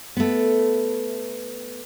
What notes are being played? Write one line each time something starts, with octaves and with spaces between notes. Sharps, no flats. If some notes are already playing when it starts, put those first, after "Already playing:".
A3 B3